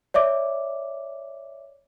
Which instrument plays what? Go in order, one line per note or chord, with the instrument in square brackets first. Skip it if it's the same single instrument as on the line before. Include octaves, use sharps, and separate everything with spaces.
[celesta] C#5 D5 E5 D6